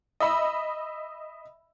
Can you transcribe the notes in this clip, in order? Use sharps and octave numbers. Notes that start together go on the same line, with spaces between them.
D#5 E5 B5